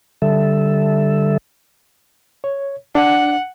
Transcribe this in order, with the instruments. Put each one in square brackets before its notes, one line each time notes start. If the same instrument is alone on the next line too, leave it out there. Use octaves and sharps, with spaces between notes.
[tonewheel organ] D3 G3 A4 E5
[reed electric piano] C#5
[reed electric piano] D4 [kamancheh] F#5